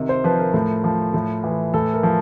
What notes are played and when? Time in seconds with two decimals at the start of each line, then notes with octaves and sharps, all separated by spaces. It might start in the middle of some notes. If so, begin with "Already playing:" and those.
Already playing: C3 D#3
0.09 C5
0.24 F3 B4
0.39 A#4
0.54 A2
0.84 F3
1.14 A2
1.44 E3
1.74 A2 A4
1.94 A#4
2.03 F3